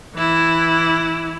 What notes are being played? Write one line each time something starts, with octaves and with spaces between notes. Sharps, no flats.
E3 E4